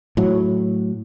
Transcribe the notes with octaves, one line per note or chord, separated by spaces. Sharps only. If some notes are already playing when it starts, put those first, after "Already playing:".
A2 F#3